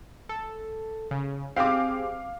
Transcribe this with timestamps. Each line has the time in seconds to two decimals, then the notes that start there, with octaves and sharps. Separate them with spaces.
0.29 A4
1.11 C#3
1.56 C4 G4 G#4 F5 D6